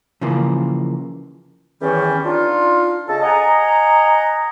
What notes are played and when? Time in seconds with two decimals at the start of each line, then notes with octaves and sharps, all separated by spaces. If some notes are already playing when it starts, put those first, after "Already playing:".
0.21 C#3 E3 F3 A#3
1.81 E2 D#3 E3 G3 C#4
2.24 D4 D#4 F4
3.08 C#3 A4 D#5 A5
3.22 D#5 F#5 G#5 A#5